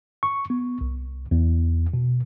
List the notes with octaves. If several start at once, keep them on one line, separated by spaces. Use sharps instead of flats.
C#6
B3
C2
E2
B2